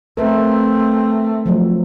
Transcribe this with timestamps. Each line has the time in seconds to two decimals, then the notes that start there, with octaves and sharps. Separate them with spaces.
0.17 A3 C4 A#4 B4
1.46 F3 F#3 A3